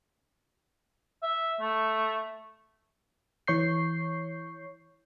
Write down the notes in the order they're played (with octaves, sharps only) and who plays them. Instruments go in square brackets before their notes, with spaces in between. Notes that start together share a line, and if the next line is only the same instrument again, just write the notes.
[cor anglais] E5
A3
[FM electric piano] E3 C#5 C#6 G6 C7